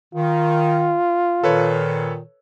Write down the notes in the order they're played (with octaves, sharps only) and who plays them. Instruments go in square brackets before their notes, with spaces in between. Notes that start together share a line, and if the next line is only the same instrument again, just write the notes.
[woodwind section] D#3 [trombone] F4
[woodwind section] A#2 D#3 [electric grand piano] A4 B4 C#5